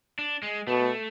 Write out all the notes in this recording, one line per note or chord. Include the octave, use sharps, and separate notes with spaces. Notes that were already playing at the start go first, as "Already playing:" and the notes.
D4
G#3
B2 A3